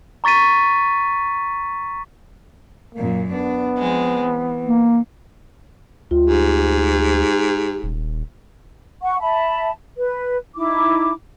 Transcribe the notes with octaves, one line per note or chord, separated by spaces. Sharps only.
A#5 C#6 A6 B6 D#7
F#2 A#2 A#3
B3 D4
F3 G#3 C4
E3
A#3
D2 F4
G#2 G4
D#1
F#5 C#6
E5 A5 B5
B4
D#4 E4 D6